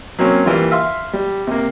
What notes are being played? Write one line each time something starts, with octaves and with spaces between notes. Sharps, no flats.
F#3 A#3 C4 C#4
E3 G3 A#3 F4
E5 F5 C6
G3
C3 A#3